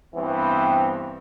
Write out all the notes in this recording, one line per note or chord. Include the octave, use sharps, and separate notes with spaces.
G2 E3 B3 C4